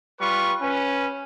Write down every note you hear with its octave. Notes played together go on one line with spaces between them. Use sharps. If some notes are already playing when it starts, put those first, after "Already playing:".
G3 F4 B4 C#6
C#4 B4